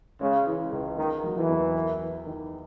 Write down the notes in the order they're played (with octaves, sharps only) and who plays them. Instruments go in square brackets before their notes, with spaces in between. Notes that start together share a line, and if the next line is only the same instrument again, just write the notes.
[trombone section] C#3 [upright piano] G#3
[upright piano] E3
C#2
[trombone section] D#3 [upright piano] A#3
[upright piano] F#3
[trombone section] E3
[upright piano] E2
A#4
E4
D#3